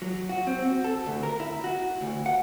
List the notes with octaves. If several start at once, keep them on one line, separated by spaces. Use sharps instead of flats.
F#3
F#4
C4
F#4
A4
D2
A#4
E4
F#4
D2
F#5